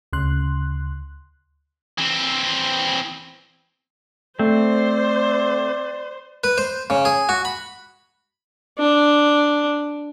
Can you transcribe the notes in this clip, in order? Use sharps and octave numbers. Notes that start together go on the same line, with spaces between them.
D2 C#3 C6 F#6
E3 C4
A3 C4 C5 D5
B4
C5
C#3
G#4
F#4
B5
D4